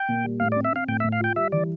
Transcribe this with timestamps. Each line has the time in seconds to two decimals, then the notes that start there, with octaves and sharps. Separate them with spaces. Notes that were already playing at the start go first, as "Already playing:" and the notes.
Already playing: G5
0.09 A#2
0.24 G3
0.40 A2 F5
0.52 D5
0.56 C4
0.64 E5
0.72 C4 F5
0.88 A2 G5
1.00 E5
1.04 A2
1.12 F5
1.20 F4 G5
1.36 G3 E5
1.52 E3 D5